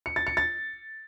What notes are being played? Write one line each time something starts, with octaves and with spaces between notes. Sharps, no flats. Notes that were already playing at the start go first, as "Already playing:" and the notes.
C#7
A6
C#7
A6